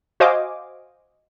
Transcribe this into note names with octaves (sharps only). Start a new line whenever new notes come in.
F#4 C5 D#5 F5 G#5 D6